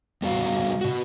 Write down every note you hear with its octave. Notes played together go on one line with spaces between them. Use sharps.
G3 B3 F#4 F5
B2 F#4